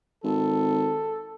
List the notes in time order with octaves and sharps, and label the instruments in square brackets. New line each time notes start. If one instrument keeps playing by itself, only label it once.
[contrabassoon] G#1 [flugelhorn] A4